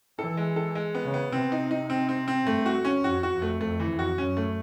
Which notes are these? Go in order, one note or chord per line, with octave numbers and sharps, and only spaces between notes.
E3 A4
G#3
A4
G#3
B3
C#3
B3
C3 C4
D#4
D#4
C4
C4
C4
G2 A3
F#4
C#4
F2 F#4
F#4
F2
A3
F2 A3
E3
F2
F#4
F#2 C#4
A3